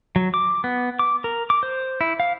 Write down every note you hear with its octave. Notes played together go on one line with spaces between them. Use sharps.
F#3
D6
B3
D6
A#4
D6
C5
E4
F5